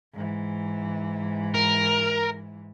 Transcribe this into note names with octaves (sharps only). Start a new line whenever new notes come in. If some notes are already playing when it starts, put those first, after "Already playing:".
G#2 E3
A#4